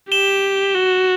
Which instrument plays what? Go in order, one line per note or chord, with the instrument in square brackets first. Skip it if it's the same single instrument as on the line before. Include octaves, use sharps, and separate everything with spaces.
[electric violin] G4 [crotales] E7 G7
[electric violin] F#4